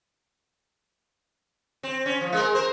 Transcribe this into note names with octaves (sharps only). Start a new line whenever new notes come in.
C4
C#4
F3
G#3 A#4
A#4 C5